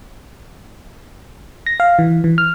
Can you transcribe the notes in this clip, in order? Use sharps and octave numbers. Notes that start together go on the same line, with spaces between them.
A#6
F5
E3
E3
F6